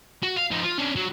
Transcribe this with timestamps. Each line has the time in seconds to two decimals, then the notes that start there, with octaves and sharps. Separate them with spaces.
0.23 F#4
0.36 F5
0.51 F3 D#4
0.64 F4
0.78 C#4 D4
0.96 F#3